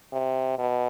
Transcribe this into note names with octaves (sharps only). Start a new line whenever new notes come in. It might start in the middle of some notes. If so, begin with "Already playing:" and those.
C3
B2